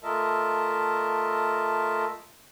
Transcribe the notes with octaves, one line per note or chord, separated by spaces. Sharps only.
A3 F4 A#4 D#5 E5 A5